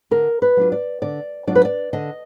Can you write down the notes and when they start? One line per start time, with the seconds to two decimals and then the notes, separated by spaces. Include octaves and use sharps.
0.11 D3 A#4
0.42 B4
0.57 F#3 D4 F4
0.72 D5
1.02 D3 D5
1.47 F#3 D4 F4 D5
1.55 B4
1.65 D5
1.93 D3 D#5